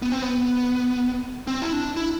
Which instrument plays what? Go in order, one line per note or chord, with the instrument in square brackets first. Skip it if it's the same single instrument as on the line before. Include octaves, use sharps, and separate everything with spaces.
[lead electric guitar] B3
C4
B3
C4
E4
D4
E4